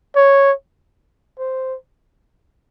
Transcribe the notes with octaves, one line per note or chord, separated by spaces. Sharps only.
C#5
C5